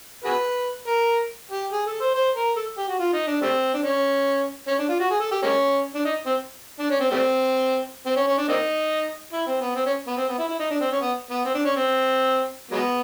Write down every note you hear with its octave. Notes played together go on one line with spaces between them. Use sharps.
F#4 G#4 B4
A#4
G4
G#4
A4
C5
C5
A#4
A4
G4
F#4
F4
D#4
D4
G3 A3 C4
D4
C#4
C#4
D4
F4
F#4
G#4
A4
G4
G#3 A#3 C#4
D4
D#4
C4
D4
C#4
C4
G3 A3 C4
C4
C#4
C#4
D4
A#3 C4 D#4
E4
C4
B3
C4
C#4
B3
C4
B3
E4
E4
D#4
D4
C4
C#4
B3
B3
C4
D4
C#4
C4
F#3 G#3 B3